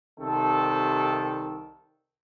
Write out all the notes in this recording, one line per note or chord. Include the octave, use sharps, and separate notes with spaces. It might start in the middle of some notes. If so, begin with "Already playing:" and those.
C2 C3 D#3 A4